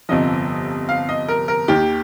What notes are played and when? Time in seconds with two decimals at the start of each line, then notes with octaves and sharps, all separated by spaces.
0.09 G1 F2 C3 F3 D#5
0.89 F5
1.09 D#5
1.28 A#4
1.48 A#4
1.68 D#2 D#3 G4